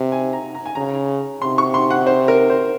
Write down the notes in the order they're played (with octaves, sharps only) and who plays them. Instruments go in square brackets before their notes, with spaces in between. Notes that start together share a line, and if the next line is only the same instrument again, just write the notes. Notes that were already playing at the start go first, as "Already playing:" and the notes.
Already playing: [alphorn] C3
[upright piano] G#5
A#5
A#5
G#5
[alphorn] C#3 [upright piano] A#5
[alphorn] C3 [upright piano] C6
[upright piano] C#6
C6
F#5
C5
A#4
C5